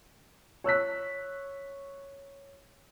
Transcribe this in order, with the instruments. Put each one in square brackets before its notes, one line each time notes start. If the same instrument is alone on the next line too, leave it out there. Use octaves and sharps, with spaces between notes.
[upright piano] C#5 E6 F#6 B6